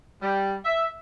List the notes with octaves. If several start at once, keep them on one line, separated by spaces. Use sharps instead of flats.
G3
E5